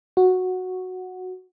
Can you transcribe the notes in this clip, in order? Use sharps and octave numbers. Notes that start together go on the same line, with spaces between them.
F#4